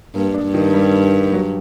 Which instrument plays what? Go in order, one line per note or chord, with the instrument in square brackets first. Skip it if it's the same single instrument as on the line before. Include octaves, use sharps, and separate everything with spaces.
[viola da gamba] G2 [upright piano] A#3
[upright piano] D4
[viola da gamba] G2
[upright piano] D#3
G3
F#3